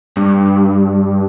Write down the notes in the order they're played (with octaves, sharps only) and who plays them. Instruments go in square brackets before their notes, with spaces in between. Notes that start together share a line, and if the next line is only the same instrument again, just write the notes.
[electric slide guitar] G2